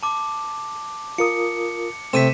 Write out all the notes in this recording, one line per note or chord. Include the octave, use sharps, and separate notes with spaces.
A5 D6
F4 A#4 D#6 C#7
C3 A3 C4 B6 D#7 E7